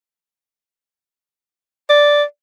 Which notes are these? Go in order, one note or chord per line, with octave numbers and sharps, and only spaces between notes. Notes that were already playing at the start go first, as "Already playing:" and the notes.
D5